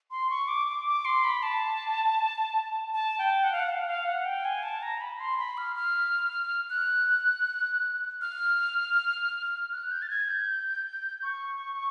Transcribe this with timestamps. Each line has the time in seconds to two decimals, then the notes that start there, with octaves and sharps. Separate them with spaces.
0.11 C6
0.30 C#6
0.48 D6
0.68 D6
0.87 D6
1.05 C6
1.24 B5
1.43 A5
2.93 A5
3.19 G5
3.44 F#5
3.52 F5
3.60 F#5
3.68 F5
3.81 F#5
3.87 F5
4.06 F#5
4.25 G5
4.45 G#5
4.63 A5
4.82 A#5
5.01 B5
5.20 C6
5.39 B5
5.57 F6
5.76 F6
6.70 F#6
8.21 F6
9.73 F#6
9.91 G6
10.02 A6
10.10 G#6
10.29 G6
11.23 C#6